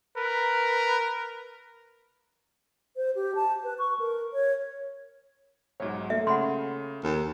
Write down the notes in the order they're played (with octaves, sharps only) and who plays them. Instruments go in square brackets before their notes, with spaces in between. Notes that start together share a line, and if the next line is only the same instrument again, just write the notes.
[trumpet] A#4 [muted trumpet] B4
[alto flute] C5
G4
A5
B4
C#6
A#4
C#5
[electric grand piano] B1 G#2 [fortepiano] F#3 C#5
[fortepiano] A3 A#3 [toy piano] E5
[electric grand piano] C#3 [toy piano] F#5 B5 C6
[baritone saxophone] D#2